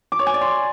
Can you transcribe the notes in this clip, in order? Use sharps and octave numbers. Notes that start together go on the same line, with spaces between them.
D6
C#5
G#5
D5
C6